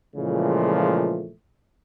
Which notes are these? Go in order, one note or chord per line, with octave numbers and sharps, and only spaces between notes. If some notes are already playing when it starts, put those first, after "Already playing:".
A#2 C#3 E3 F3 G#3 A3